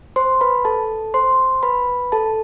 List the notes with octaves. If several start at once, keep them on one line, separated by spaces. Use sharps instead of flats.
C5 C6
B4 B5
A4 A5
C5 C6
B4 B5
A4 A5